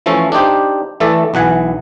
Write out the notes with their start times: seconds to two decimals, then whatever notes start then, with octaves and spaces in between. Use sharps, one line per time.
0.06 E3 F3 A3 C#4 A4
0.32 D4 D#4 G4 C5
1.00 E3 A3 A4 D5
1.34 B1 E3 F#5 G#5